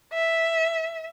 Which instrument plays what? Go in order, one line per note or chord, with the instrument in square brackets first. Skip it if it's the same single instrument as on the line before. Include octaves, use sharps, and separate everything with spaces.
[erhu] E5